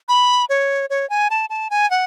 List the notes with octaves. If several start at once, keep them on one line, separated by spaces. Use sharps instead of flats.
B5
C#5
C#5
G#5
A5
A5
G#5
F#5